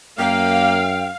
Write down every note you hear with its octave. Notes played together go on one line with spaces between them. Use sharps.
F#2 A#3 F5 G5